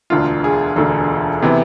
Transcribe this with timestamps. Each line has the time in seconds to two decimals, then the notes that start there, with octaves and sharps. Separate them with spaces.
0.10 E1 D2 D3 F4
0.44 G#4
0.76 E1 D2 D3 A4
1.42 C3 E3 B3